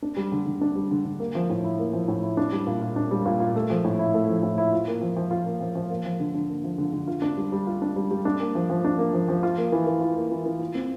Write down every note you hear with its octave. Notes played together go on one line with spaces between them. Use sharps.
D4
G3
D3
D3
D4
G3
D3
D3
A#3
F3
A2
E4
A#3
F3
A2
E4
D4
G3
A#2
F4
D4
G3
A#2
F4
A3
F3
A2
E4
A3
F3
A2
E4
F4
A#3
F3
F3
F4
A#3
F3
F3
A#3
F3
D3
D3
A#3
F3
D3
D3
F4
D4
G3
G3
F4
D4
G3
G3
D4
A#3
F3
F3
D4
A#3
F3
F3
F4
A#3
E3
E3
F4
A#3
E3
E3
F4
C4